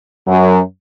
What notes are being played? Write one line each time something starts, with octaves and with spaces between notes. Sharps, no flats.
F#2 F#3